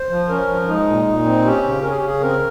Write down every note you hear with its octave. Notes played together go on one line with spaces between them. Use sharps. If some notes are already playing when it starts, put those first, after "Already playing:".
Already playing: C5
F3
C#4 A#4
F3
G#3 D#4
A#2
A#2
C4
C#4 G4
C#3
C#4 A#4
G#4
G4
C#3 G#4
C4 A#4